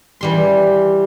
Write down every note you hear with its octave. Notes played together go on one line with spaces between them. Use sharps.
E3 G3 C6